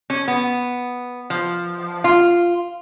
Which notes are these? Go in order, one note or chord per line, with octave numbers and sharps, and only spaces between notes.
C#4
B3
F3
F4